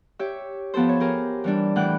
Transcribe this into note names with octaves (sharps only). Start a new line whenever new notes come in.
G4 C#5 E5
F3 B3 G4 A4 C5
C#5
G4 G#4 A#4 C5
E3 G3 D4
A2 E3 F#5 G5 F#6